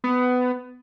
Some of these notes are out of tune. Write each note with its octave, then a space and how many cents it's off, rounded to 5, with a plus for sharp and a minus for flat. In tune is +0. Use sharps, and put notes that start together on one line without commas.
B3 +20